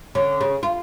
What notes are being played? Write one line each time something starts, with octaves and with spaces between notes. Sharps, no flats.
D3 C#4
C#3
F4